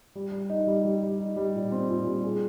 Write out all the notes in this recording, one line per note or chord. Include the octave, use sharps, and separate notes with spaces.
G3
G3
D#4
G3
G3
G3
D#4
G3
A#2
C4
A#2
G3
G#4